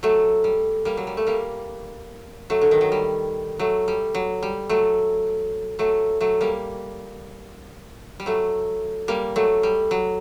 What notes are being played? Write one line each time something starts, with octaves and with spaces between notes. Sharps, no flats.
F#3 A3
G3
G3 A#3
F#3
G3
A3
G3 A#3
F#3 A3
D3
D#3
F#3
G3
F#3 A3
G3
F#3
G3
F#3 A3
F#3 A3
F#3 A3
G3 A#3
G3
F#3 A3
G3 A#3
F#3 A3
G3
F#3